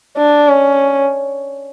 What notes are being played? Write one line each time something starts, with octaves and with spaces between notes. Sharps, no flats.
D4
C#4